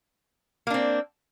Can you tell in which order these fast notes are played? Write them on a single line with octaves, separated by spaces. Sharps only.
A#3 D4 C4